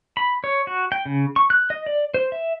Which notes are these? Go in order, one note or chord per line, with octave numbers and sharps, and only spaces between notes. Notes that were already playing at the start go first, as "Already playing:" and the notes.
B5
C#5
F#4
G5
C#3
C#6
F#6
D#5
D5
C5
E5